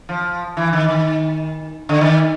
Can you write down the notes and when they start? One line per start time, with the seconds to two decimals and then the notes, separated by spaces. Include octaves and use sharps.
0.09 F3
0.57 E3
0.73 D#3
0.88 D#3
1.89 D3
2.01 D#3